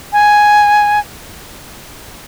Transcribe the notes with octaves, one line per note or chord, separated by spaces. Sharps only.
G#5